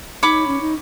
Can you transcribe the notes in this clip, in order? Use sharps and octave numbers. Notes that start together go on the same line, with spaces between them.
D#4 C#5 B5 D6
C#4
D#4